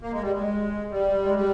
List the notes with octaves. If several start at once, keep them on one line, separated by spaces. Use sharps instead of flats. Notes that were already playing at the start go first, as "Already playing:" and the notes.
A#3
G#3
G3
G#3
G3
G#3
G3